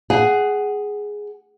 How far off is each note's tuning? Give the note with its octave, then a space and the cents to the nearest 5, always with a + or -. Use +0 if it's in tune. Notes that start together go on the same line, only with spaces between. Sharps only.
G#4 +0 F#5 +15